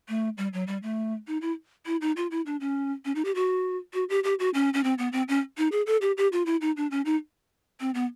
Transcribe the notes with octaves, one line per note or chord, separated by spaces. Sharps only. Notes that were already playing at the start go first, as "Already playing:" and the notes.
A3
G3
F#3
G3
A3
D#4
E4
E4
D#4
F4
E4
D4
C#4
C#4
D#4
G4
F#4
F#4
G4
G4
F#4
C#4
C#4
C4
B3
C4
C#4
D#4
G#4
A4
G4
G4
F4
E4
D#4
D4
C#4
D#4
C4
B3